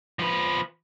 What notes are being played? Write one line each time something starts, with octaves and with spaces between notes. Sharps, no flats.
F3 B4